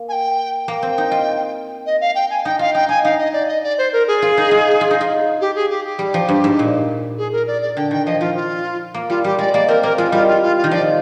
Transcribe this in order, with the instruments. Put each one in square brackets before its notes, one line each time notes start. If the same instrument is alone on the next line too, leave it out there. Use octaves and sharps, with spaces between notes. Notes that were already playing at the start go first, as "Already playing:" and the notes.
Already playing: [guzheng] A#3
[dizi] G#5
G5
[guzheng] A#3 [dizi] G5
[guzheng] C4
D#4
F4
[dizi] D#5
F5
G5
G#5
[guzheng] D#4 [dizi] G5
[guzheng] F4 [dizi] F5
[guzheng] D#4 [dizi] G5
[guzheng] D#4 [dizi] G#5
[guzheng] D#4 [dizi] F5
[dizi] D#5
D5
D#5
D5
C5
A#4
G#4
[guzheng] F4
D#4
F4
F4
D#4
F4
[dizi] G4
G#4
G4
G4
[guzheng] G3
F3
G2
G#2
A#2
[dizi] G#4
A#4
D5
D5
[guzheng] D3 [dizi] G5
[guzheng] D#3 [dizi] G5
[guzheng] F3 [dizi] D#5
[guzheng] F3 [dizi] F4
[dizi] F4
[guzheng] A#3
[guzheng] G3 [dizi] F4
[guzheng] G3 [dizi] G4
[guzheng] G#3 [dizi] D5
[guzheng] A#3 [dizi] D5
[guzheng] C4 [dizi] A#4
[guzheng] A#3 [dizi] A#4
[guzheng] G#3 [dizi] F4
[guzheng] G3 [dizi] F4
[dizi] F4
F4
F4
[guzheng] D#3
[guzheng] F3 [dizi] D5